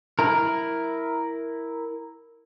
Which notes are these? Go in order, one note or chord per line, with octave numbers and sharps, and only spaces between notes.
E4 A#4